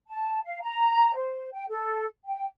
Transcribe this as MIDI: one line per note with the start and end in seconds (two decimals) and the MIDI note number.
0.08 0.39 81
0.45 0.59 77
0.62 1.13 82
1.14 1.49 72
1.52 1.65 79
1.68 2.04 69
2.25 2.44 79